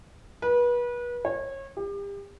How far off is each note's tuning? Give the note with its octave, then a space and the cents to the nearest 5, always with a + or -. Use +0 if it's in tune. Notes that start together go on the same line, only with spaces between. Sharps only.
B4 -30
C#5 -30
G4 +35